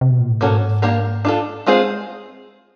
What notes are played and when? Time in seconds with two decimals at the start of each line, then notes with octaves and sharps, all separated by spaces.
0.01 C3
0.11 B2
0.21 A#2
0.30 A2
0.41 G#2 F3 A#3 C#4 F#4 A4
0.82 A#3 D4 G4 A#4
1.25 D4 F4 A4
1.66 G#3 C4 F4 G#4 C5